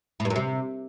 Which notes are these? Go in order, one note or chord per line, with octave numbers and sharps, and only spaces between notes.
A2
G2
F#2
C3